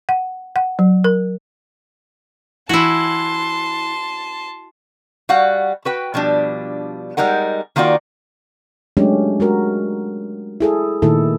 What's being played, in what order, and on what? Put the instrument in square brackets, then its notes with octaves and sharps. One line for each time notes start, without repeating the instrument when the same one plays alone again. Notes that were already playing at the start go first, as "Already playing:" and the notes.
[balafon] F#5
F#5
F#3
A#4
[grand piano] E3 [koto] E4 F#4 [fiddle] A5 C6
[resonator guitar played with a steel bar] G3 F#4 F5 F#5
F#4 B4 G5
B2 F3 G3 D4
G3 G#3 D#4 A#4 F#5
D#3 A#3 F4 F#4 D5
[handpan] F#3 G#3 A3 C#4 D4 G4
G#3 F#4 A#4
E4 G#4 A4
A#2 D#3 A3 E4 A4